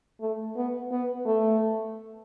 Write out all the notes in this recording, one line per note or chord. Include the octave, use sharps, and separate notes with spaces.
A3
B3
B3
A3